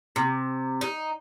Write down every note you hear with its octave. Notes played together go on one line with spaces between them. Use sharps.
C3
D#4